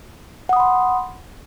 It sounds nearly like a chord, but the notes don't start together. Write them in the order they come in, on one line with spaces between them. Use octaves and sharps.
F#5 D#6 B5 C6